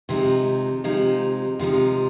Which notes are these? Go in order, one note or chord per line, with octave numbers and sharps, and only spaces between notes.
C3 F3 G#3 D#4
C3 F3 G#3 D#4
C3 F3 G#3 D#4